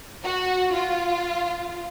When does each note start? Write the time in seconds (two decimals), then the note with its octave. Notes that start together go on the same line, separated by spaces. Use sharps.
0.23 F#4
0.73 F4